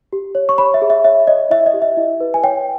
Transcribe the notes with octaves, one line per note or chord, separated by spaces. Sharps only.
G4
C#5
C#6
C#5 B5
E5
G#4
E5
C#5 E5
C#5 D#5
E4 E5
D#5
G4
E5
E4
B4
G#5
C#5 G5